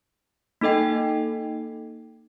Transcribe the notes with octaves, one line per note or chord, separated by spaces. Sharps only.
A#3 D#4 A4 D#5 G5